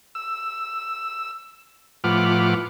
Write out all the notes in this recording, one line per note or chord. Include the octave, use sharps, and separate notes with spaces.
E6
A2 F3 B4 F#5 D6 F6